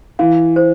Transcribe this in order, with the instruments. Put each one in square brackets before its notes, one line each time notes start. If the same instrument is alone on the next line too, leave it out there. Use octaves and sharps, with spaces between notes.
[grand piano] E3 [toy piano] F5
[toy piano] C5